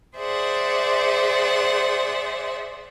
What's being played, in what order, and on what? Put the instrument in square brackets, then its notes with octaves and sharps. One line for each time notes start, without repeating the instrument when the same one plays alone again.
[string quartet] G#4 C5 D5 E5 F#5